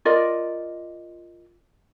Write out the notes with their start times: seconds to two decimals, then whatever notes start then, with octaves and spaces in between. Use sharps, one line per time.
0.05 F4 A#4 D5 D#5